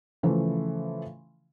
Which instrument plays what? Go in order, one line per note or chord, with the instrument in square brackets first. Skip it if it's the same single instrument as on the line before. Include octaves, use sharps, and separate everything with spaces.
[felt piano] C#3 E3 F3 A3